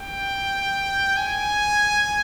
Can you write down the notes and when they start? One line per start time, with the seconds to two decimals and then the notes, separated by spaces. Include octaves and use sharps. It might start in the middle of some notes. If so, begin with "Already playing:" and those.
Already playing: G5
1.17 G#5